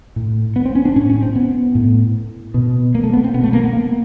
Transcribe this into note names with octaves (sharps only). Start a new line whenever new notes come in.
A2
B3
C4
C#4
D4
A2 C#4
C#4
C4
B3
A2
B2
A#3
A3
B3
C4
B2 B3
A3
A#3
B3
A#3